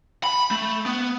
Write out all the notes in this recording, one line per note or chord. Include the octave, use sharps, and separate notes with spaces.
B5
A3
B3